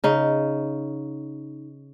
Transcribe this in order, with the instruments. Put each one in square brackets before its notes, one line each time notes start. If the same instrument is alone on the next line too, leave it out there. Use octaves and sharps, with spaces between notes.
[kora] C#3 D#4